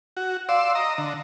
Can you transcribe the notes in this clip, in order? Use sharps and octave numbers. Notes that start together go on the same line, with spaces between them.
F#4
D5 F5 C6 E6
D#5 A#5
D3